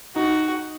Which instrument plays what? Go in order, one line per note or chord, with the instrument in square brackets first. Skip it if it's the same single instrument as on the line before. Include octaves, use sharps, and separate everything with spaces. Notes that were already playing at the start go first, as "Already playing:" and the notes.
[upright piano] D#4 [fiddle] F#4